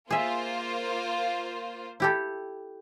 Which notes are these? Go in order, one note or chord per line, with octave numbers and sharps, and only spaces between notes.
A#3 F4 G#4 C5 E5
E4 G4 A4